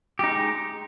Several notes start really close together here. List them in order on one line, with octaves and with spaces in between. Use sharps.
G4 D#4 G#3